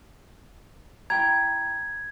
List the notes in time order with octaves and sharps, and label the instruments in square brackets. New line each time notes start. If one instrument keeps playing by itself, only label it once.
[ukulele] E4 G5 A#5 [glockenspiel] G#6